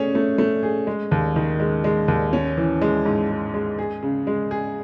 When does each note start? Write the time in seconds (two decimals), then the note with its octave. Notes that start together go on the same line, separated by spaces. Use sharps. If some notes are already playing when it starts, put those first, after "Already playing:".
Already playing: A3 C#4 G#4
0.15 A3
0.38 A3
0.63 G#4
0.87 G#3
1.11 D#2
1.36 D#3
1.60 G#3
1.84 G#3
2.08 D#2
2.33 C#4
2.57 E3
2.82 G#3
3.05 G#2
3.30 G#3
3.54 G#3
3.78 G#4
4.02 C#3
4.27 G#3
4.51 G#4